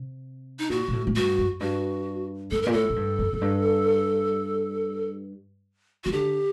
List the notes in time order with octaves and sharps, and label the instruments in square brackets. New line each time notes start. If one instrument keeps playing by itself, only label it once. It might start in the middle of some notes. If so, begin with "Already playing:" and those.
Already playing: [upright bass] C3
[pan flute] D#4
[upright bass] A#2 [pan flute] F#4
[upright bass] A#2
A2
A2
[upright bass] G2 [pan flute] F#4
[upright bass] F#2
[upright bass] G2 [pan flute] F#4
[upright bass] G2 [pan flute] A4
[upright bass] A#2 [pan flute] A#4
[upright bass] A2 [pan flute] A4
[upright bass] A2
G2
F#2
F#2
G2
[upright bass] D#3 [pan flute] F#4
[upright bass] D3 [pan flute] G4